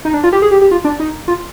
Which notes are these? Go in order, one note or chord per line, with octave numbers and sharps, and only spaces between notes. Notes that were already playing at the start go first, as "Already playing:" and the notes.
D#4
D4
F4
G4
G#4
G4
G4
F4
D4
D#4
F4